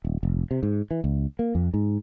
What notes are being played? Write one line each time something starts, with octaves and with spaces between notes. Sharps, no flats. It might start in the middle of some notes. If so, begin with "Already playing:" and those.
D#1
F1
C3
G#2
E3
C#2
A#3
F2
G#2